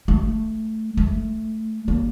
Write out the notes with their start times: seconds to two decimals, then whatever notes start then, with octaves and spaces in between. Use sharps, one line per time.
0.08 A3
0.97 A3
1.88 A#3